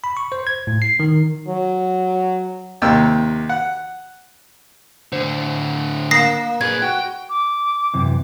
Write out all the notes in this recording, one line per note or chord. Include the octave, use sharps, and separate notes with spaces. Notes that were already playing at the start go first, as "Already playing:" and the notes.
B5
C#6
C5
G#6
A2
C7
D#3
F#3
D#2 C3 G5 E6
F#5
A2 D3 C5
A#3 D#6 A#6 C7
A#2 G#4 B4 G#6
F#4 G5
D6
F#2 C3 E3